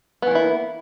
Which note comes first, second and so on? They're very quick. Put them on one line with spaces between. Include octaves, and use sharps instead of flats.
B3 E3 A#3 E4